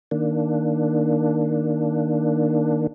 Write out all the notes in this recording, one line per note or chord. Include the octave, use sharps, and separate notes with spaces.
D#3 A#3 D4